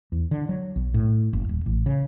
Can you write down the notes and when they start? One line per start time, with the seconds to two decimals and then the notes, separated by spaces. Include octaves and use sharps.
0.12 E2
0.31 D3
0.49 F#3
0.76 B1
0.94 A2
1.33 F#1
1.49 D#1
1.66 A1
1.86 C#3